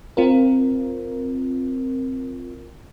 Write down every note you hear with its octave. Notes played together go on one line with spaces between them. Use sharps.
C4 F4 A#4